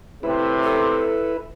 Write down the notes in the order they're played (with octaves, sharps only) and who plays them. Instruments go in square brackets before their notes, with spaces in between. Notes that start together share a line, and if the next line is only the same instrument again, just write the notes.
[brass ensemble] A2 C3 [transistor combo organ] E4 B4
[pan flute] A4